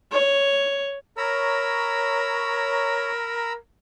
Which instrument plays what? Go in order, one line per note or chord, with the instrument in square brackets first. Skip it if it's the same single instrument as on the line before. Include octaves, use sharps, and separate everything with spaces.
[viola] C#5
[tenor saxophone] A#4 [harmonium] C#5 [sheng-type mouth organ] A#5 B5 E6